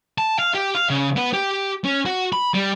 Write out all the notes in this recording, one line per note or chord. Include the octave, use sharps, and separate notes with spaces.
A5
F5
G4
F5
C#3
B3
G4
C#4
F#4
B5
G3